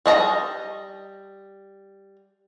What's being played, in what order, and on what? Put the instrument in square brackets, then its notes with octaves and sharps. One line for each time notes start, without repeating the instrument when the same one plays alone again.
[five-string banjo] G3 D#5 A5 A#5